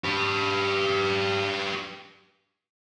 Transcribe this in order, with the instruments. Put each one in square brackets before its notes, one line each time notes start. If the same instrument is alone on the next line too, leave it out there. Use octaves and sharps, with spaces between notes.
[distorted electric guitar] G4 B4